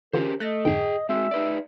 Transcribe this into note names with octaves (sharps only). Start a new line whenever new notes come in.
D3 E3 C#4 F4 G4 A#4 C5
A3 D#5 F#6 A6 A#6
F2 G#2 D3 G#4 G5
G#3 C4 F#4 E5
D#4 B4 D5